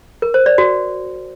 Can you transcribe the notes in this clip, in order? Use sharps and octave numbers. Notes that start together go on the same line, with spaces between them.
A#4
C5
D5
F#4